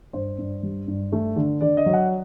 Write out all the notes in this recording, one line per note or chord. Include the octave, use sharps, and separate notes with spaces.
G2 C5
G2
G3
G2
A3
D3
D3 D5
D#5
F#3
F#5